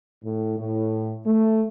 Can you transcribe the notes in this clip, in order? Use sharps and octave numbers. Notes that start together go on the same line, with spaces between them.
A2
A2
A3